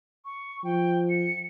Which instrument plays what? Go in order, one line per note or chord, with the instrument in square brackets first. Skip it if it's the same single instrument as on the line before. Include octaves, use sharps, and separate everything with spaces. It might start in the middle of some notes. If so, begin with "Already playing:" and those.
[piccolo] C#6
[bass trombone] F3 [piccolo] G5
[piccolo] C#7